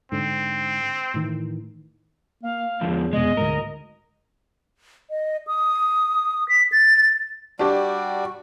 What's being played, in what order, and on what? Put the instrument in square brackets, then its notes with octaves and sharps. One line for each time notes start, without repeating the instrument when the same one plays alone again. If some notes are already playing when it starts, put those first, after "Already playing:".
[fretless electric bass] G#2 D3 [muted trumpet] C4
[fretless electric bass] A2 D#3 E3
[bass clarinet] A#3 [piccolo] F5
[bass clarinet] E2 [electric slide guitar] G#2 D3 F3
[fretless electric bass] F1 B2 [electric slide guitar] G#3 [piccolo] D#5
[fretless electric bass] D2 G#2 [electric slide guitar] A#4
[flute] D#5
D#6
B6
A6
[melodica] G3 F#4 [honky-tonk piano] D4 G4